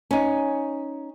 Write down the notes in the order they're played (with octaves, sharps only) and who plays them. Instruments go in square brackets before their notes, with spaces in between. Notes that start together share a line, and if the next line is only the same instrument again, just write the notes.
[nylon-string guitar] C#4 D#4